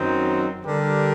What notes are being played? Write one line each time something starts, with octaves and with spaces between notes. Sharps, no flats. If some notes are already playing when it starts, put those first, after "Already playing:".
Already playing: F#2 D#3 F#3 C4 D#4
D3 G3 D4 G4 A#4